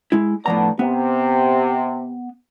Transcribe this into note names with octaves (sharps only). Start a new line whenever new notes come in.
G#3 E4
A2 F3 B3 D4 A#5
C3 B3